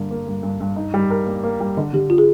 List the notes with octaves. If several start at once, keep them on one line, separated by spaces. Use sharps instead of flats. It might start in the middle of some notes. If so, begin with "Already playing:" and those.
Already playing: G2 D3 A#3
A#3
G2
G2
G2
D#4
G3
A#4
A#3
A#3
G3
D3 D#5
D3 G4
F4
G#4